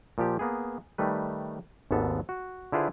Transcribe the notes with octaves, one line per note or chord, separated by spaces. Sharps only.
A#2 F3 G4
A#3 B3 G#4
D#3 G3 A3 B4
G#1 D#2 G#2 B3 A4
F#4
D3 E4 F4 G#4 B4 C5